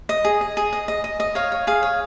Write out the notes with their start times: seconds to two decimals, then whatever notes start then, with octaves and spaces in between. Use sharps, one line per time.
0.09 D#5
0.25 G#4
0.41 D#5
0.57 G#4
0.73 D#5
0.88 D#5
1.04 D#5
1.20 D#5
1.35 C#5 F5
1.52 C#5
1.67 G#4 F5
1.83 C#5